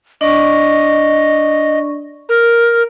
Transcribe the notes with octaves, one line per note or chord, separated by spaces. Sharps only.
D4 D5 D#5 C#6
A#4